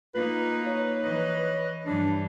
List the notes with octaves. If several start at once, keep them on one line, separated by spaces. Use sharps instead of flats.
A#3 D#4 F4 B4
C#5
E3 D#5
G2 E3 D4